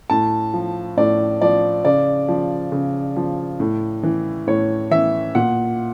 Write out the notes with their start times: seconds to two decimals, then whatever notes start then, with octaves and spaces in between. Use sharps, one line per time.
0.10 A2 A5
0.54 F3
0.97 A2 D5
1.42 F3 D5
1.84 C#3 D5
2.28 F3
2.72 C#3
3.16 F3
3.60 A2
4.03 E3
4.47 A2 C#5
4.91 E3 E5
5.35 A#2 F#5